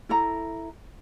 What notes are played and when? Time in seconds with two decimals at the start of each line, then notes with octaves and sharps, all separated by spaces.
0.09 E4 A4 A#5